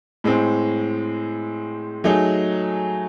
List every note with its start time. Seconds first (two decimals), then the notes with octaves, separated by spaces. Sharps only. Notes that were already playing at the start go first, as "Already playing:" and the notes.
0.24 A2 G#3 C4
2.04 F#3 A3 D#4 G#4